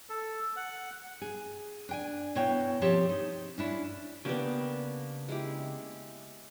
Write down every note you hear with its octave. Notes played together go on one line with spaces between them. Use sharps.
A4
F#5
G#4
D4 G5 G#5
B2 E4 C#5 G5
F3 C4 G4 C#5 A5
D#4
C#4 D4 E4
C#3 A#3 B3 D4 G4
G#3 E4 G4